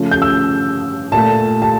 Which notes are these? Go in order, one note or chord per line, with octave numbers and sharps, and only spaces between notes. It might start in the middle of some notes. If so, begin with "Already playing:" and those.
Already playing: C#3 F3 A3
G6
E6
A#2 A3 A5
A5